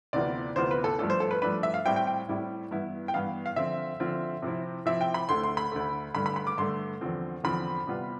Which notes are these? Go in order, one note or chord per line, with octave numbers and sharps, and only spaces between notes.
D2 C3 E3 B3 F4 D5
D2 C3 E3 B3 F4 C5
B4
A4
G2 F3 A3 D4 A4
C5
A4
B4
G2 F3 A3 D4 B4
E5
F5
A2 G3 C4 E4 G5
G5
G5
A2 G3 C4 E4
G2 E3 B3 E4
G5
G2 E3 B3 E4 F5
F5
D3 F3 C4 F4 E5
D3 F3 C4 F4
C3 F3 C4 E4
C3 F3 C4 E4 E5
G5
B5
D2 D3 A3 C6
C6
B5
D2 D3 A3
G2 D3 A3 B5
B5
B5
D6
G2 D3 A3 C6
E2 D3 F3 C4
E2 D3 F3 C4 B5
C3 G3 B3 F4